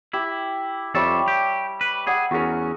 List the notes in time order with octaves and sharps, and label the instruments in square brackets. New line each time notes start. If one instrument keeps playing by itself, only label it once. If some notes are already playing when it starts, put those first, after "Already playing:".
[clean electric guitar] E4 [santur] G4
[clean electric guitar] F2 C4 A4 [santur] G3 C#5 E5
[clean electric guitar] G4
B4
[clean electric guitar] G#4 [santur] F#5 G#5 E6
[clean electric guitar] E2 C#4 [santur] F#4 G#4 A#4